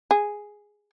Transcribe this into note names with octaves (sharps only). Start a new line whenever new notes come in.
G#4